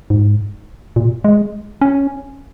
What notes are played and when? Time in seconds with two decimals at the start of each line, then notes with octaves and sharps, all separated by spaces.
0.10 G#2
0.96 A#2
1.24 G#3
1.81 C#4